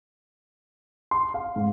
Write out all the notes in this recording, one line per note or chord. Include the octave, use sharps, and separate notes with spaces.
C6
F5
G#2